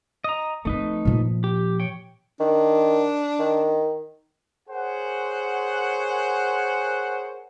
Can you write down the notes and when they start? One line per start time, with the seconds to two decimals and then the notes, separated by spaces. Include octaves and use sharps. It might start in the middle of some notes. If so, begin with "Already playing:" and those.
0.24 D#5 A#5
0.65 F3 A3 C4 D#4 B4
1.05 A#2 F3
1.44 G4
1.80 C#5 G5
2.40 D#3 D4
3.39 D#3
4.69 G#4 A#4 C5 C#5 F#5